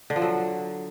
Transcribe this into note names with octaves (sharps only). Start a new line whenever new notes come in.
D3
F3
F#3